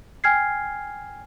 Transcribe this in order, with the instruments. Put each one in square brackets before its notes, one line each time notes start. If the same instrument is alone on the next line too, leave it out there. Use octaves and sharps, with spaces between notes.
[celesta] G5 G#5 F6 G#6 C7